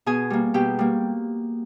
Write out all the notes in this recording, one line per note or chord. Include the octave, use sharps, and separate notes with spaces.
B2 G#4 G#5
G3 A#3
B2 G4 G5
G3 A#3